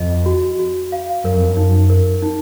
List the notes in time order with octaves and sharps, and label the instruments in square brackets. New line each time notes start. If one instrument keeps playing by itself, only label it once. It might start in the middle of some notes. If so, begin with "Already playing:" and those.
Already playing: [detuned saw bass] F2 [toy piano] D#5
[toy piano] F#4
F#4
F5
[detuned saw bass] F#2 [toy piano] A#4
[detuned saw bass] F2
F#2
[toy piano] D#4
A#4
D#4